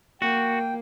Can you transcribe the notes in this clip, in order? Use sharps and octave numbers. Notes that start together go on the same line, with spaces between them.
A#3 F#4 G5